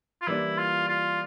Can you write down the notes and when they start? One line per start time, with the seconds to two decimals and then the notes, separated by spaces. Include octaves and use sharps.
0.22 F4
0.27 E3 G3 A#3 D4 E4
0.58 F4
0.88 F4